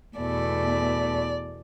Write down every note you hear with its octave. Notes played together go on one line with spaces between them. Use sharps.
E2 B2 A3 D5